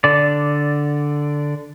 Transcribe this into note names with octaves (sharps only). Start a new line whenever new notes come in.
D3 D5